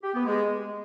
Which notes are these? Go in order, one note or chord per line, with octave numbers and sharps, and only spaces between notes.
G4
B3
G#3